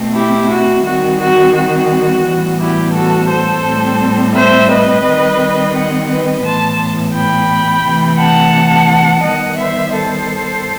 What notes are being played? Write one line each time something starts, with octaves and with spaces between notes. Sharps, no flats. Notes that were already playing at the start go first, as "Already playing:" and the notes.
Already playing: B2 A3 C4
E4 G4
F#4
D#3 G3 C4 F#4
F#4
F#4
A2 E3 G3 B3
E4 G4
F#4 A4
A4 C5
A2 G3 C4
C5 E5
B4 D#5
D#3 G3 C4
D#5 F#5
B4 D#5
A2 E3 B3 A5 C6
G5 B5
C3 E3 A3
F#5 A5
D#3 G3 B3 D#5 F#5
C5 E5
A4 C5